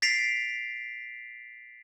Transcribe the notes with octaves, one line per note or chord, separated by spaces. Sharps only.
A6 B6 C7 D7 F7